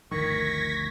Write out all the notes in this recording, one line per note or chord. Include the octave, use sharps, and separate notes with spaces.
G1 D2 D#3 F3 C#6 G#6 A#6 B6